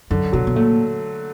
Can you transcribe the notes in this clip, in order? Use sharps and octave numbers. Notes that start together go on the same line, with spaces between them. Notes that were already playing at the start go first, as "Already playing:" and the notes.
F#2 D3
B2 F#3
B2
A#2 A3